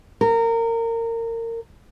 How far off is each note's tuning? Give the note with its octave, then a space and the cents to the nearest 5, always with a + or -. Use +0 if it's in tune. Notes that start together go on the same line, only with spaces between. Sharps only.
A#4 -25